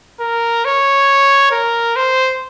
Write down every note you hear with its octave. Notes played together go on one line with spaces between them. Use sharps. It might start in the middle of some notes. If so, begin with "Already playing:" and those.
A#4
C#5
A#4
C5